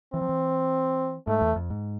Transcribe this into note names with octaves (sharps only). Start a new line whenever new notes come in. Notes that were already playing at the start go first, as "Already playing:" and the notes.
E3 C4
F3
E3
G#2 A3
E2
F2
G#2